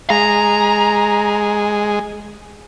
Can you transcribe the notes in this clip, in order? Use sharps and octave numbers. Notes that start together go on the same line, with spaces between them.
G#3 A#5